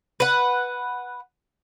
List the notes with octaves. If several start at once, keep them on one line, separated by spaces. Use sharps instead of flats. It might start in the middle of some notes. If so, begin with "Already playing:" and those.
B4 F#5